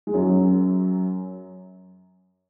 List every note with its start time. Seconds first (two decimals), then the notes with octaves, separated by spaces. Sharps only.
0.07 G#3
0.14 F#2 F#3